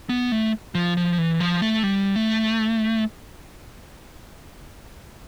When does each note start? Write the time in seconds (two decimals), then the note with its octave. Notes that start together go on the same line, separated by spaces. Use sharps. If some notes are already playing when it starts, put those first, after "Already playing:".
0.09 B3
0.32 A3
0.75 F3
0.97 F3
1.18 E3
1.40 F3
1.62 A3
1.83 G3
2.16 A3